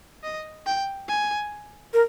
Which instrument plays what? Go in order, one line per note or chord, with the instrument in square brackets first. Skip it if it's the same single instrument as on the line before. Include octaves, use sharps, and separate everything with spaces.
[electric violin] D#5
G5
G#5
[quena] A#4